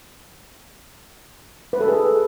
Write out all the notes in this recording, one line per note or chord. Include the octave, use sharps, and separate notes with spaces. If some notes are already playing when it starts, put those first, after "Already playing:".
B4
A4
G#4